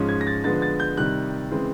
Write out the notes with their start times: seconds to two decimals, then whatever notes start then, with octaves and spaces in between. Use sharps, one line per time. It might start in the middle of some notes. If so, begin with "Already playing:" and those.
Already playing: G#2 F3 G#3 C#4
0.09 G#6
0.21 A#6
0.27 A6
0.44 D3 F3 G#3 B3 A6
0.62 A6
0.80 G6
0.97 C3 D#3 G3 F#6
1.51 C#3 E3 G#3 C4